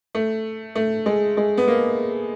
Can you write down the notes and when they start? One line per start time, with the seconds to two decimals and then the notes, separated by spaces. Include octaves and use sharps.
0.15 A3
0.75 A3
1.06 G#3
1.37 G#3
1.57 B3
1.68 A#3